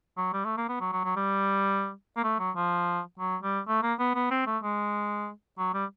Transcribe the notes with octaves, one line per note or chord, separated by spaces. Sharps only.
F#3
G3
A3
A#3
B3
F#3
F#3
F#3
G3
A#3
A3
F#3
F3
F#3
G3
A3
A#3
B3
B3
C4
A3
G#3
F#3
G3